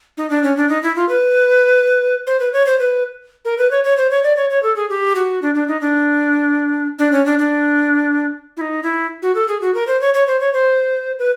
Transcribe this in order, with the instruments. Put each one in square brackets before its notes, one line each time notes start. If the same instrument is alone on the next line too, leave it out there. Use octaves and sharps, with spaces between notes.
[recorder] D#4
D4
C#4
D4
D#4
E4
F4
B4
C5
B4
C#5
C5
B4
A#4
B4
C#5
C#5
C5
C#5
D5
C#5
C#5
A4
G#4
G4
F#4
D4
D4
D#4
D4
D4
C#4
D4
D4
E4
D#4
E4
F#4
A4
G#4
F#4
A#4
C5
C#5
C#5
C5
C#5
C5
B4